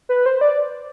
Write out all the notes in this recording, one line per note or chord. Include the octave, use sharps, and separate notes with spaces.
B4
C5
D5